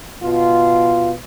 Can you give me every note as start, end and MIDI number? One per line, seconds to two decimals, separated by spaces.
0.23 1.12 47
0.23 1.12 65